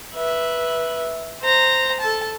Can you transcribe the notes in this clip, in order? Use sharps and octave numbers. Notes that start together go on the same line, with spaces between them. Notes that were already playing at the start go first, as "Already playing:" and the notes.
B4 E5
C5 A#5
A4 A5